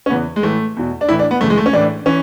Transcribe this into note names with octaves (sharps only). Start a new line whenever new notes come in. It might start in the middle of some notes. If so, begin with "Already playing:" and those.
C#4
E2 C#3 E3 B3
G#3
A2 E3 A3
E2 B2
D4
A2 E3 E4
D4
B3
F#2 C#3 E3 A3
G#3
A3
C#4
A2 E3 D4
E3 C#4